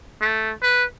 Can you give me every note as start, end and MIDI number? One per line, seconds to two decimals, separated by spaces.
0.21 0.51 57
0.63 0.85 71